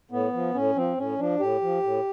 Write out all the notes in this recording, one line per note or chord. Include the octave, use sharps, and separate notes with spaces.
A2 B3
F3
A2 C#4
F3 C4
A2 C#4
F3 D4
A2 G4
F3
A2